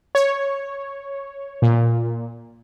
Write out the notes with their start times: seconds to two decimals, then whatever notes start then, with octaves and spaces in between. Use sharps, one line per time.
0.15 C#5
1.62 A#2